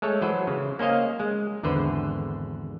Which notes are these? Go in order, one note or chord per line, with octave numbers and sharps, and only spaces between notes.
G#3 A3 A4 C#5
E3 F#3 B4 C5
C#3
A#3 C#4 C5 D#5 F5
G#3
G#1 E2 D3 B4 C5